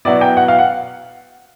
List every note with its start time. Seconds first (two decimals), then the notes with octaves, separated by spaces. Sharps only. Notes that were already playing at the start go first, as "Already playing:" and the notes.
0.05 B2 F#3 B3 E4 D5
0.21 G5
0.37 F#5
0.48 F5
0.59 F#5